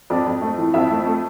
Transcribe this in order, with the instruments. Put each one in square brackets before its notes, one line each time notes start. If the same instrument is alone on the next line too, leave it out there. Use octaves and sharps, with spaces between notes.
[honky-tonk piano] F2 D5
F2
A3
E3
F2 E5
A3
A3